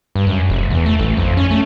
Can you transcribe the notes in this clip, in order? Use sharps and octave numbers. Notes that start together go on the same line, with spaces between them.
G2
F#2
F1
E2
A3
A1
F2
C#4
A3